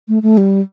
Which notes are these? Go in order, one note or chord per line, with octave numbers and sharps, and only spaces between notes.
A3
A3
G3